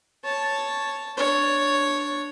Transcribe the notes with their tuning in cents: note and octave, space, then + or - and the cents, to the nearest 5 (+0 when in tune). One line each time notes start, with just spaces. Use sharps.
C#5 +0 A5 +0
D4 +0 C#5 +0